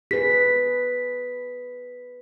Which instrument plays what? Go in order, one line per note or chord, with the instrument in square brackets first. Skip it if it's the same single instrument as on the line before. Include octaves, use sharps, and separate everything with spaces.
[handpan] G#4 B4 [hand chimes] B6